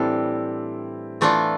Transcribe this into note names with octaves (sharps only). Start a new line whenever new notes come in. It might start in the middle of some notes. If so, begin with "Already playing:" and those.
Already playing: A2 E3 G3 C4 D4 E4 A4
E3 A3 D4 F4